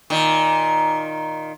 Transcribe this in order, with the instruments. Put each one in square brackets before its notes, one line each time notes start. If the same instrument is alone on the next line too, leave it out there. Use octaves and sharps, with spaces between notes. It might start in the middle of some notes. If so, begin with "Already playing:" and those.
[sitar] A#2 D#3